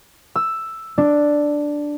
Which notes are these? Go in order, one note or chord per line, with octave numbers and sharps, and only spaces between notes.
E6
D4